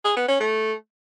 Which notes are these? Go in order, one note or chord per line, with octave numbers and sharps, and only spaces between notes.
G#4
B3
C#4
A3